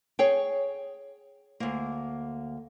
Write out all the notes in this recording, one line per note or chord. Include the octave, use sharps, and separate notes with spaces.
G#4 C#5 G5
D2 A#3